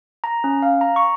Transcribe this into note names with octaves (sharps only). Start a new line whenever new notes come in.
A#5
C#4
F5
A#5
C#6